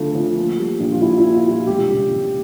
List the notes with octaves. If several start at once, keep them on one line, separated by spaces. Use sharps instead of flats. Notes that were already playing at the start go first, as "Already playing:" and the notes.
Already playing: D2 D3 F3 A3 F4
F3
A#3
G3
A#1
F4
A#2 E4
E4
A#3
F4
G3
F4
E1 G4
C#3
E1